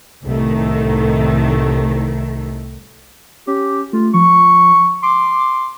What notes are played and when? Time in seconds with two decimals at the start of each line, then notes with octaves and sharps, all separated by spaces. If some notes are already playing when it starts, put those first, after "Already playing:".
0.24 C2 A2 D#3 A3
3.47 C#4 G4
3.93 A3 F4
4.14 F3 C#6
5.03 C6 D6